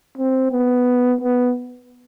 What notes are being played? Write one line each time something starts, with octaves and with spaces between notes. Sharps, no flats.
C4
B3
B3